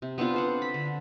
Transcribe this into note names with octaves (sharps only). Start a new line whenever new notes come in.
C3
B3 C4 D4 F4
A4 C5 F#5
B5
D3